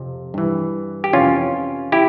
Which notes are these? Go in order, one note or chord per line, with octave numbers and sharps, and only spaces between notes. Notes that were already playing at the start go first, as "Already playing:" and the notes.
Already playing: F2 C3 F3
G2 E3
G4
F2 C3 E3 C#4 F4
E4 G4